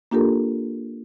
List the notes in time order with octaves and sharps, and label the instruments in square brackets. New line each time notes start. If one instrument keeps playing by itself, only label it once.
[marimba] A#3 D4 F4 G4 A4 A#4